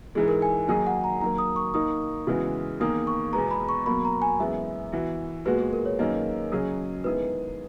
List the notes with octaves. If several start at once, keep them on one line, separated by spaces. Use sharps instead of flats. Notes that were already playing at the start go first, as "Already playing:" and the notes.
G#2 E3 G#3 G#4
A#4
G#5
D#3 F#3 A#3 D#4 G#4 G#5
F#5
A#5
D#3 F#3 A#3 A#5
D#6
C#6
D#3 A#3 D#4 D#6
C#3 E3 G#3 B3 F#4
E2 D#3 A#3 D#6
C#6
E2 B2 G#3 B3 A#5
B5
C#6
B2 F#3 A#3 B5
A#5
G#5
F#2 E3 G#3 B3 E5
E3 B3 F#4
A#2 G#3 B3 F#4 B4
G#4
A#4
C#5
F#2 D#3 A#3 D#5
C#3 F#3 C#4 G#4
D#3 G#3 B3 E4 G#4 B4